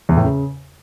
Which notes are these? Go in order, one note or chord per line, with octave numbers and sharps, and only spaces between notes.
E2
A2
C#3